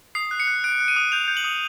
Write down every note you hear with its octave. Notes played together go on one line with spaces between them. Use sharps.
D#6 C7
F#6
C#7
F#6
F#6 D7
F#6
D#7
D#6
G6 F7
G6
F#7
D#6